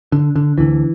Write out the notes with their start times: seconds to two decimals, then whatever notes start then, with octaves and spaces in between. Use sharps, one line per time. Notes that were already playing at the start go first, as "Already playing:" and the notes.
0.12 D3
0.36 D3
0.58 D2 D3 E3